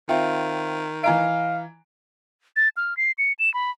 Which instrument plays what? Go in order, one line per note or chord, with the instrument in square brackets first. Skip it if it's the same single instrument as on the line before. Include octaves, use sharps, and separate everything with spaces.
[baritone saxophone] D#3 [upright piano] C4 F4 [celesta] E5 G5
[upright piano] E3 A#5 D7 [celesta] D#5 [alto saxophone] F5
[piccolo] A6
F6
C7
C#7
E7
B5